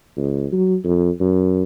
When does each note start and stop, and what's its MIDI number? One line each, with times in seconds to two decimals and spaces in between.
0.17 0.46 37
0.52 0.76 54
0.85 1.10 41
1.20 1.63 42